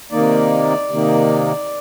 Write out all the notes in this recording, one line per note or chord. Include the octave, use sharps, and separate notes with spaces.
C3 D#3 A#3 D#4 D5
C3 D#3 A#3 D#4